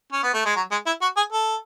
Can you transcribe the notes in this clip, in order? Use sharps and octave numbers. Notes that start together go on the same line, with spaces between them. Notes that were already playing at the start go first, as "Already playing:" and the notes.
C#4
B3
A3
G#3
F#3
G#3
E4
F#4
G#4
A4